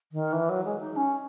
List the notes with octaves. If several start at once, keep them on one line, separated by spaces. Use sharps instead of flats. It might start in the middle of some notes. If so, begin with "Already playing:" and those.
D#3
E3
F#3
G#3
D#4
C#4